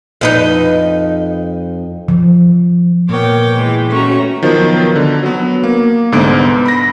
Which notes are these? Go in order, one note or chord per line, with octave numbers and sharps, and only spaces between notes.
F2 D#4 B4
F3
A#2 B3 A#4 C#5 G5 D6
E3 G#3
A3 C#4 F#4 C#5 A#5 C#6
D#3 F3 F#3 B3
D3
F#3 B3
A#3
C2 G#2 D3 B3 C5 D7
B5 A#6